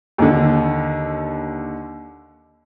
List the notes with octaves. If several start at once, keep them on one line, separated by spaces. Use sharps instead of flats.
D#2 D3